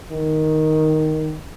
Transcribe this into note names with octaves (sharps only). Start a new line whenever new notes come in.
D#3